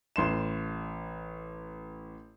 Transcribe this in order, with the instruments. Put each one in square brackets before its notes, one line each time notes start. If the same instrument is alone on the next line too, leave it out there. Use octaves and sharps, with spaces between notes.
[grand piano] A1 C6 E7